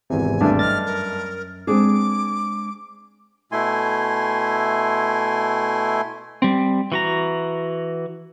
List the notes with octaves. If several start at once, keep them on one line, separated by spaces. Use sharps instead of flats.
G#1 E2 C3 G#5
G2 A3 D4
F#2 D#5 F6 A6
A#4
G#3 C4 D4 G#4 D6
B2 A3 E4 G#5 C6
G3 C4
E3 F#4 A#5